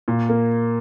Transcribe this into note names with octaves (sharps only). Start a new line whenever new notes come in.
A#2
A#3